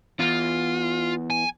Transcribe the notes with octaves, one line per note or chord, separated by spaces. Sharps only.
E2 F4
G#5